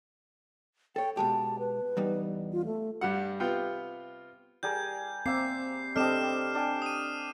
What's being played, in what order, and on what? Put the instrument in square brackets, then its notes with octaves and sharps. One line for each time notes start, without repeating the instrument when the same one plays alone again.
[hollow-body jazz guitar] A4 C#5 [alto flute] G5
[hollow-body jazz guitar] B2 G#3 G4 [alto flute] A5
[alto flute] B4
[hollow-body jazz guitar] E2 G3 D#4
[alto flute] F4
A3
[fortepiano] G2 G3 F#5
C3 B3 F4 G5
[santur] G3 G#4 A#4 [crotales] G6
[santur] A#3 E5 [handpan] C4 [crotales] C7
[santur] G3 D4 [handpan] C4 A4 D#5 [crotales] F6 C7 E7
[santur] D4 G4 G#5
[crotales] D#6 D#7